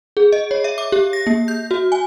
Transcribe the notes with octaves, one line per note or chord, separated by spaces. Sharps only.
G#4
D#5
C#5
E5
D6
G4
A#6
A#3
G6
F#4
G#5